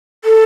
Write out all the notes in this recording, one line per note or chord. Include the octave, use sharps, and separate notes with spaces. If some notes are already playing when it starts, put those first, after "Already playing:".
A4